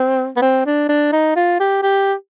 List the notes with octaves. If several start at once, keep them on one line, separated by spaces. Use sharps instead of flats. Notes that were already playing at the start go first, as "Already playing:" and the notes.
Already playing: C4
B3
C4
D4
D4
D#4
F4
G4
G4